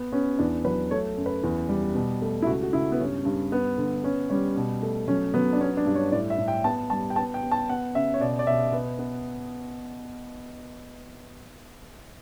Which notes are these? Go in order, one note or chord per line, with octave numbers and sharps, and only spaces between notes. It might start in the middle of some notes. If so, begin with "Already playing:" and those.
Already playing: B3
B3 C#4
E2 D4
F#3 B4
A3 C#5
F#2
B4
E2
G3
B2
A3
E4
C#2 F#4
F#4
C#2 E4
B3
G2 C#4
G2
B3
D3
B3 C#4
G3 C#4
B2
A3
F#3 C#4
F#3 B3
D4
B3 C#4
D4
G2
C#5
A2 D5
E5
A2
G5
B3 A5
G3 A5
G5
B3 A5
G5
B3
A5
B3 F#5
C#3 E5
C#5
B2 D5
D5
B2 E5
B3
B3